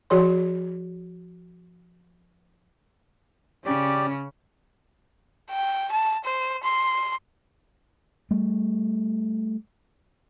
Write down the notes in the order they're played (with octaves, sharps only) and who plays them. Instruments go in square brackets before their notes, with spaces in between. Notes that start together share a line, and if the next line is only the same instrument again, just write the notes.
[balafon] F3 F#4 G#4 C#5 C6
[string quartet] C#3 [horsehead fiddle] C#4 [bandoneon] G4 D5
[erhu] G5
A5
C5
C6
[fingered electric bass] G3 A3